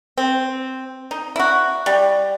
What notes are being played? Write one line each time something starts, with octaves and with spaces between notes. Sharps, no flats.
C4
D#4
E4 F#4
G3